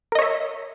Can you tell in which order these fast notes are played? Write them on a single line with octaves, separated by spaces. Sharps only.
A#4 D#5 C#5 E5